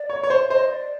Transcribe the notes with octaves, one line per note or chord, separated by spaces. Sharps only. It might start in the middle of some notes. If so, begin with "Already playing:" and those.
Already playing: D5
C#5
C#5
C5
C5 D#5
D5